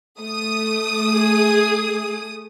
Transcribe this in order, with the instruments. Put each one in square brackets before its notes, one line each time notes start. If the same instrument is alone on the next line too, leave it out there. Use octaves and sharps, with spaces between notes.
[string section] A3 D#6
[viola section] G#4